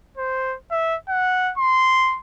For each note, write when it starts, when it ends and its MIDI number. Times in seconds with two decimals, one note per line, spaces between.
0.17 0.55 72
0.71 0.96 76
1.09 1.52 78
1.58 2.19 84